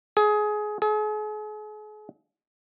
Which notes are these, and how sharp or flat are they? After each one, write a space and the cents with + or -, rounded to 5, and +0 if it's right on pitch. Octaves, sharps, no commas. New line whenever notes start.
G#4 +20
G#4 +40